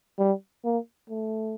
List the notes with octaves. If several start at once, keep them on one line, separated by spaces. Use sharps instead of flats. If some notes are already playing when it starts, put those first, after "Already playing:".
G3
A#3
A3